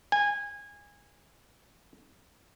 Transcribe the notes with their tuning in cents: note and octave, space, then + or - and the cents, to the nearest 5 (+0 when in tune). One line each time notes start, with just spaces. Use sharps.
G#5 -20